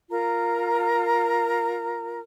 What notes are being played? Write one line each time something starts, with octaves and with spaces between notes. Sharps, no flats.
F4 A#4 A#5